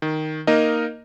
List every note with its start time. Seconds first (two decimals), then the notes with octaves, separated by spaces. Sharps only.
0.02 D#3
0.47 A#3 D#4 A#4 D#5